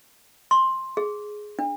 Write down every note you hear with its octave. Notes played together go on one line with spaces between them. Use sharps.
C6
G#4
D4